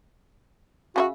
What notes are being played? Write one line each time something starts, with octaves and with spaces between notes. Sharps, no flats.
C#3 D4 F#4 E5